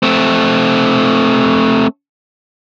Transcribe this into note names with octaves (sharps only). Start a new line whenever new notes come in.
A3 C4